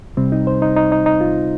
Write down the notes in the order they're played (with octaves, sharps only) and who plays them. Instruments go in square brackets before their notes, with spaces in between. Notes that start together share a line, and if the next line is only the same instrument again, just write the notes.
[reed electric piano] C2 C3 G3 C4
D#4
C5
D#4
D#4
D#4
D#4
F4